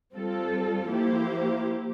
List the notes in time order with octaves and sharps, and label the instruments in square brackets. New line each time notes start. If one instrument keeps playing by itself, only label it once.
[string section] G3 C4 F4 A4
F3 A#3 E4 G4 C5